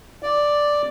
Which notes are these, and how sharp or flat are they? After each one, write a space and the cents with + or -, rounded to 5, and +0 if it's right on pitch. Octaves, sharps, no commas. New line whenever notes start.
D5 +0